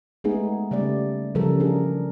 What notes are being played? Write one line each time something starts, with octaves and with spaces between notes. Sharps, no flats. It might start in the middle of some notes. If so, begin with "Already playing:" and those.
G#3 A3 B3 D#4 G#4
C#3 G3 A3 D5
C#3 E3 F3 G3 A4 A#4
D4 G#4 A#4